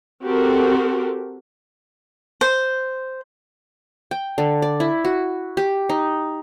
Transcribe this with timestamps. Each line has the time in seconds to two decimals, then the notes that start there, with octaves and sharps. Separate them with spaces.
0.23 C4 F#4 G4 A4 A#4
2.41 C5
4.11 G5
4.38 D3
4.62 D5
4.80 E4
5.05 F#4
5.57 G4
5.89 D#4